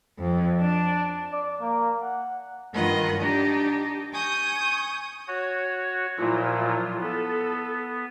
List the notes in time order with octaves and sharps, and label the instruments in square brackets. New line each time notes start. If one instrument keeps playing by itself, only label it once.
[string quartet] F2
D4
[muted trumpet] D5
A#3
F#5
[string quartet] G2 D#3 F4 B4 D#5 F#5
D4 D#4 G4
G#5 C#6 D#6 G6
[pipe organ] F#4 C#5
[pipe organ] A#2 F#3 [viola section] F3 E4 F4
[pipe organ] B3 [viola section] A4